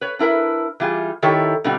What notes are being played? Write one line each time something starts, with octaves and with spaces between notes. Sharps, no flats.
B4 C#5
D4 E4 A#4 B4
E3 G3 F4 G#4
D#3 E4 G4 A4 C#5
B2 D3 G3 C4 D4 F4